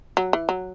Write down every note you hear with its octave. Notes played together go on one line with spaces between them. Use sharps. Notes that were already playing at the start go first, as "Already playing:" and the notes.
F#3
E3
F#3